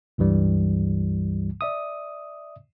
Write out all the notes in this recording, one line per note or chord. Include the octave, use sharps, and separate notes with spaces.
C#2 G2 E3 G3
D5 E5 D#6